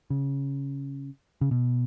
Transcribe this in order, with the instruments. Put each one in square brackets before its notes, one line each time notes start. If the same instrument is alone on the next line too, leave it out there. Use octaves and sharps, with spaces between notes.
[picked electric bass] C#3
C#3
B2